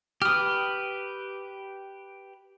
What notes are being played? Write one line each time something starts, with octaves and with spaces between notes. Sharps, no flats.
G4 B4 D#6 F6